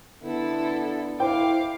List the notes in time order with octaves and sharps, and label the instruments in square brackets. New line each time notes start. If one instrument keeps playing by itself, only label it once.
[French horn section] D3 B3 [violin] E4 A4
[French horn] E4 [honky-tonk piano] C5 G5 [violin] F5 D6